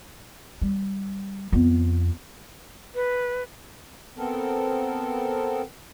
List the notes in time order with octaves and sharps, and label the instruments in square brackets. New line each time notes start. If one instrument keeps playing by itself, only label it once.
[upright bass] G3
F2 B3
[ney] B4
[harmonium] B3 C4 A4 A#4